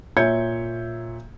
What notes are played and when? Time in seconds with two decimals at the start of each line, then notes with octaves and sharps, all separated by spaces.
0.17 A#2 C#5 E5 G6 G#6 C#7